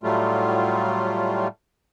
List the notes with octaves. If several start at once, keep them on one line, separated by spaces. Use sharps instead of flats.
A2 F#3 G3 A3 F4